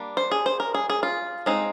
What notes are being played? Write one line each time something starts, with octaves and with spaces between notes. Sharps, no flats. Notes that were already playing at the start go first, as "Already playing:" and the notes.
Already playing: G3 A#3 D4
C5
G#4
C5
A#4
G#4
G#4
F4
G#3 C4 D#4